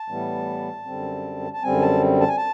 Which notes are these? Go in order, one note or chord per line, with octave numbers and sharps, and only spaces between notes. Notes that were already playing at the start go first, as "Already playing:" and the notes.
Already playing: A5
A2 E3 G3 B3
F#2 D3 G3 C4
A5
F#2 D3 G3 C4 G#5
A5
A5
G#5
A5